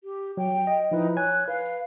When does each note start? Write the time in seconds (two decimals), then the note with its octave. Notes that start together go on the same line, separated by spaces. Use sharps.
0.04 G4
0.37 F#3 G5
0.67 D#5
0.92 F3 D#4 E4 B4
1.17 C#5 G#5 F#6 G#6
1.48 B4 F5